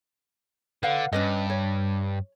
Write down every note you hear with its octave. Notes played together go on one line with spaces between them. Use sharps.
D3 B4 F5 F#5
G2 C#4 B4 D#5
C#5